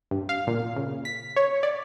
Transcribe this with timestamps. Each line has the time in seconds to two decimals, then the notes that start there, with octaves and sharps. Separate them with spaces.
0.11 G2
0.29 F5
0.47 A#2
0.76 C#3
1.05 B6
1.36 C#5
1.63 D5